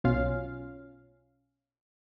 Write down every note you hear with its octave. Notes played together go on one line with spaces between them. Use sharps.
B1 B2 C#4 F4 F5